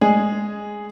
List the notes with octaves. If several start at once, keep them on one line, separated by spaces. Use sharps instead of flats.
G#3 G#4